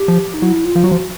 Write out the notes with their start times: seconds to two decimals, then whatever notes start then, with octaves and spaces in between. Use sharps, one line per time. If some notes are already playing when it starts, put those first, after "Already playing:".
Already playing: G4
0.08 F3
0.34 D#4
0.42 F#3 E4
0.65 F4
0.76 F3
0.84 F#3
0.87 F3 F#4